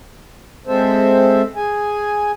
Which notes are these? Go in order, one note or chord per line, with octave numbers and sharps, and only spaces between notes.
G#3 C4 A4 C5 E5
G#4 G#5